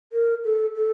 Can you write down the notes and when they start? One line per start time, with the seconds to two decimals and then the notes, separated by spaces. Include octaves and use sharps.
0.13 A#4
0.44 A4
0.75 A4